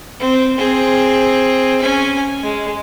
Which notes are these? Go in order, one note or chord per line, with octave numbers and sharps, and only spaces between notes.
C4
C4 G#4
C#4 G#5
G#3